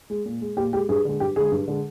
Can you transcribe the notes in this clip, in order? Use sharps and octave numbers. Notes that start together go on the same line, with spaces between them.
G#3
A#2
G#3
A#2 G4
G#3 G4
G2 G#4
D3 G#3
G2 G4
D3 G#3 G#4
G2
D3 G#3